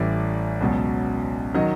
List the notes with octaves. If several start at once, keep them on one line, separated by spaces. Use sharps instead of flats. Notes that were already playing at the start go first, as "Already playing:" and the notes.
Already playing: A1 A2 E3 G3 D5
C#2 B2 F#3
D#3 F#3 D#5